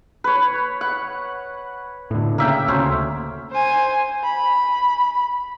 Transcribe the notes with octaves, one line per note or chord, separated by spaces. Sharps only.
B4 C#5
F#5
A2 D3
C#3 A#3 E5 G5
D2 C#4 C5
C5 G#5
B5